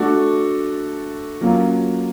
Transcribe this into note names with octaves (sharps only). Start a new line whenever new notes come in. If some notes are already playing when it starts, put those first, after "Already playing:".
Already playing: A3 D4 F#4 A4
F#3 A#3 C#4 F4